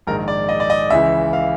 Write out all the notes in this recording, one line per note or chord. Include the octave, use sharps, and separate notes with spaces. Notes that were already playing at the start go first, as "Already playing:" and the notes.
A#1 G#2 D#3 A#4
D5
D#5
D5
D#5
C#2 C#3 E3 E5
F5